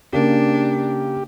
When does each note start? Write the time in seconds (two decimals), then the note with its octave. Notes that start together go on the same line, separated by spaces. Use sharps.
0.13 C#3 A#3 D4 G4